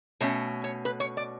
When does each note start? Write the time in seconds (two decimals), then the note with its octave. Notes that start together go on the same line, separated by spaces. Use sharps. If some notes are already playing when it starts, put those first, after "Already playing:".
0.21 B2 A3 C#4 C#5
0.64 C#5
0.85 B4
1.00 C#5
1.17 D5